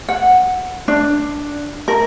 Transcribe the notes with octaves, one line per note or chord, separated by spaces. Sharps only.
F#5
D4
A#4